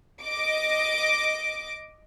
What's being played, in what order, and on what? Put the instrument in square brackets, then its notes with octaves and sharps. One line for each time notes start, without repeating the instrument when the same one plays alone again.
[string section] D#5 D6